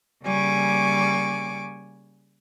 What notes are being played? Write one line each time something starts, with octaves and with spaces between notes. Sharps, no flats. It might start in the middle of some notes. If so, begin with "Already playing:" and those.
C#3 G3 A#3 G#5 C#6 D6